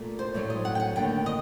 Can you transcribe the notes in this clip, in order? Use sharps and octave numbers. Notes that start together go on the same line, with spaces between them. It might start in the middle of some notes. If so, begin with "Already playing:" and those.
Already playing: A#2 A3
C5
A2 F#3 A3 D5
D#5
F#5
G5
F#5
D#2 D3 A3 G5
D#5